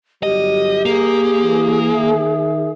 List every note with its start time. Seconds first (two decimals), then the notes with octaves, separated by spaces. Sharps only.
0.23 G1 F#3 G3 G4 D#5
0.86 A#3 G#4
1.43 E3
1.95 D#3 E5